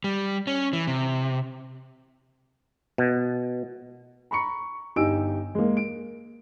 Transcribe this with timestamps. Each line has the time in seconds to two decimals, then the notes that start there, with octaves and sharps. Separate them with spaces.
0.04 G3
0.47 C#4
0.73 E3
0.87 C3
2.98 B2
4.31 A#5 B5 C#6 C#7
4.96 G1 D#4 G4 G#5 E6 D7
5.55 G#3 A#3
5.77 D7